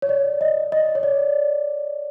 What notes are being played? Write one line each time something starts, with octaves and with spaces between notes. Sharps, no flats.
C#5
D5
D#5
D#5
C#5
D5